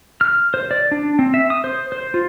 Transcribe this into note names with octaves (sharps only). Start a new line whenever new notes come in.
F6
C5
D5
D4
C4
E5
D#6
C5
C5
F4